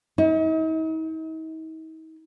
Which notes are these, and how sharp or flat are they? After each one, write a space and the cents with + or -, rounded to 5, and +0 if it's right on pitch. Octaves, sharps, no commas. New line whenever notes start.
D#4 +45